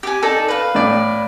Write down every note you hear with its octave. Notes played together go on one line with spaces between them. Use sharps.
G4 G#5
D#4 A4 D5
B4 F5
A2 D5